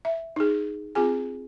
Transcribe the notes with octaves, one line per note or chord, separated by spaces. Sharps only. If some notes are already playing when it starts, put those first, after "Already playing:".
E5
D#4 G#4
C4 F4 G#4 G#5